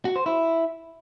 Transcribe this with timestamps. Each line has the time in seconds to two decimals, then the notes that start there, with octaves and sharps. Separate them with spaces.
0.05 F#4
0.16 C5
0.26 E4